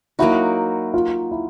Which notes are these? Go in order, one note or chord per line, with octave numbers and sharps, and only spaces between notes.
F#3 A#3 D#4 E4 F#4
F4
E4